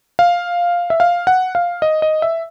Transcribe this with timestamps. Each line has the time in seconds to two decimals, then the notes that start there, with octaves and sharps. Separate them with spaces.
0.19 F5
0.90 E5
1.00 F5
1.27 F#5
1.55 F5
1.82 D#5
2.02 D#5
2.22 E5